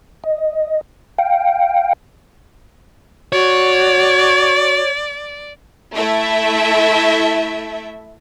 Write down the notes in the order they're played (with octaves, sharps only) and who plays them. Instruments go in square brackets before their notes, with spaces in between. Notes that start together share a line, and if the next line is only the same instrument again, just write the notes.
[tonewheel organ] D#5
F5 G5
[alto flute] F#4 [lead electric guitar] C#5 [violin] D5
[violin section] A3 E4 E5